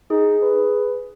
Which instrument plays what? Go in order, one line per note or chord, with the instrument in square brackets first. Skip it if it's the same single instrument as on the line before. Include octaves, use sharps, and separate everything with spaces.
[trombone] D#4 [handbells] G#4
[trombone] B4